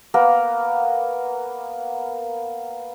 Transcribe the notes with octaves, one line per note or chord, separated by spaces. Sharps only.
A#3 B3 A#4